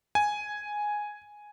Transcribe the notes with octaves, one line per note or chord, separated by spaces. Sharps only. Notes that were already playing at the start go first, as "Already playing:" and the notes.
G#5